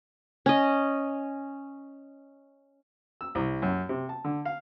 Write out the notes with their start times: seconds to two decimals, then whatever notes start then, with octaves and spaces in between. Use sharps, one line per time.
0.46 C#4 D#5
3.21 E6
3.35 C2
3.62 F#2
3.89 C3
4.09 A5
4.24 D3
4.45 F5